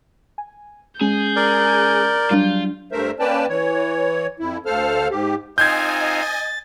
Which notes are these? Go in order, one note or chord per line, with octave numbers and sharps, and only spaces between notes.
G#5
G#3 C#4 G#4 G6
A#4 D5
F#3 G3 D4 F4
G2 A3 A#4 C5 E5
A#3 C#4 B4 D5 G5 A5
E3 C#5
F2 E4
D2 A4 C5 F5 F6
G#2 G4
C4 D#4 F4 D#5 G#5 G6 G#6
A6